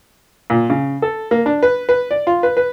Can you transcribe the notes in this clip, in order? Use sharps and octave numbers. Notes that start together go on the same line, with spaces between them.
A#2
C#3
A4
A#3
D4
B4
B4
D5
F4
B4
B4